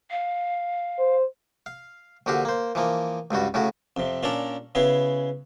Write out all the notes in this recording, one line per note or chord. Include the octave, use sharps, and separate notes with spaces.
F5
C5
F5
A#1 D3 F#4 G4 F5
A#3 C5
E3 F3 A#3
C#2 G2 G3 F#4
A2 C#3 C#4 F#4
F2 C3
A#2 C#4 D4 A4 A#4
C#3 B3 E4 F#4 G#4